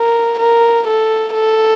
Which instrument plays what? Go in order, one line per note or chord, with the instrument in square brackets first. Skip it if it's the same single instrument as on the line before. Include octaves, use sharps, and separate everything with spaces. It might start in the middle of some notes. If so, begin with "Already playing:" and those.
Already playing: [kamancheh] A#4
A#4
A4
A4